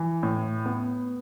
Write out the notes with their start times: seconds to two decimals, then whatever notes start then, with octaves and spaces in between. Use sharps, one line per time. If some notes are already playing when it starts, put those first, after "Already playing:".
Already playing: E3
0.23 A2
0.66 B3